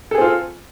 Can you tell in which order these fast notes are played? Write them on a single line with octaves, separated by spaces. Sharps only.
A4 G#4 C4 F4